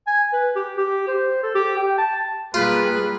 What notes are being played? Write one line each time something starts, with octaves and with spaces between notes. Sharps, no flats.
G#5
B4
G4
G4
C5
A4
G4
G5
A5
G3 A#3 F4 G#4 B4